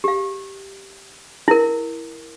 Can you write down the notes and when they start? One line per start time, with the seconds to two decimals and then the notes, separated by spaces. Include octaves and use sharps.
0.04 G4 F5
1.48 E4 A#4